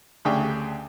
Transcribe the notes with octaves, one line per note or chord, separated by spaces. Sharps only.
D2 C#3 D4 G4 G#4 G5